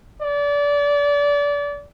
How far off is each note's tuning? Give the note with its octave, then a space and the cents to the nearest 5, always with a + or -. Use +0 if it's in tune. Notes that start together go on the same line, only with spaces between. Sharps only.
D5 -30